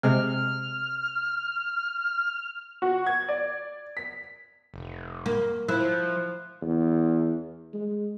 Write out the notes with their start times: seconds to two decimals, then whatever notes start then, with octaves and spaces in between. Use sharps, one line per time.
0.03 C3 G#3 F6
2.82 F#4
3.06 G#6
3.29 D5
3.97 B6
4.74 F1
5.26 A#3
5.69 F3 E4 C5 F#6
6.62 E2
7.73 G#3